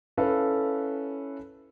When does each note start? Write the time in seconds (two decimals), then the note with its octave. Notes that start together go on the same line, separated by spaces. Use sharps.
0.17 C#4 E4 A4 B4 F5